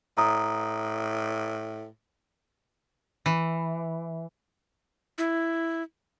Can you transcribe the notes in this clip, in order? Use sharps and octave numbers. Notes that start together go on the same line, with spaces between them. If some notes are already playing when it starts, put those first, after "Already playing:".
A2 A#5 D#6
E3
E4